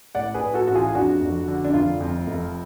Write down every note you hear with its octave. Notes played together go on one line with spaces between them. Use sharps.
A2 D5 F#5
G#4 B4
A2
F#4 A4
A1 F#4
F4 G#4
G#4
F2 D4 F#4
F1
D3
D4
F1 F4
F2
F1